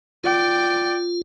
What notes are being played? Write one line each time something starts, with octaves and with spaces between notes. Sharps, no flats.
F4 D5 G5